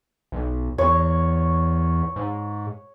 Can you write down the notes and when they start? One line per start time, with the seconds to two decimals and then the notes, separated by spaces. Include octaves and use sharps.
0.32 B1
0.78 E2 C#5
2.16 G#2